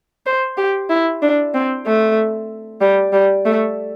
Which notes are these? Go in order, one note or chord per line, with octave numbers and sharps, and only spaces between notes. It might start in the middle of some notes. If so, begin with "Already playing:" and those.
C5
G4
E4
D4
C4
A3
G3
G3
A3